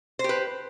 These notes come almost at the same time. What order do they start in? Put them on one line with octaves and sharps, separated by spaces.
C5 G4 B4